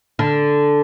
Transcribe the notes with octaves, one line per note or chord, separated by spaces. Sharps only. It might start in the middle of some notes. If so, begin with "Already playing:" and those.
D3